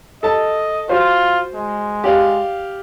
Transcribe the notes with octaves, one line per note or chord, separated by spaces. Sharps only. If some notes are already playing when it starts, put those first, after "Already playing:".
A4 D#5 A5
F4 F#4 C5
G#3
G4 D5 F5